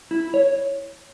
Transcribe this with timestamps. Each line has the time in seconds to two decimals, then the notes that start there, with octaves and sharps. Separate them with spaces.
0.11 E4
0.34 C#5